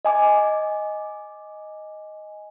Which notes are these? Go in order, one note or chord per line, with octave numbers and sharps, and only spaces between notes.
D#5 G#5 D6